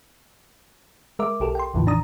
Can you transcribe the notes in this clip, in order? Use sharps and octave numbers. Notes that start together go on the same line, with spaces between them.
G#3 A#4 E5 D6
B1 G4 A4 A#4
G5 C6
A1 E2 A2 D3 E3 F3
D#3 D4 A#5 D#6